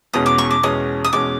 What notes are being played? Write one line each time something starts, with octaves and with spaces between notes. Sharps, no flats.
E2 B2 G#3 C#4 D#6
D6
C#6
D6
E2 B2 G#3 C#4 D#6
D#6
E2 B2 G#3 C#4 D6